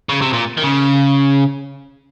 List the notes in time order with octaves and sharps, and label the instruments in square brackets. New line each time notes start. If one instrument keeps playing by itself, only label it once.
[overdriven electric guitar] C#3
C3
A#2
D#3
C#3